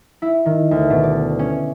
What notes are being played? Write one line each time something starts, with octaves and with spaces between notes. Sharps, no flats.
E4
D#3
D2
B2
D5
C#4